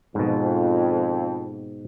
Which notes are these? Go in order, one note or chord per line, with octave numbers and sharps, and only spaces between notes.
F2 G#2 B2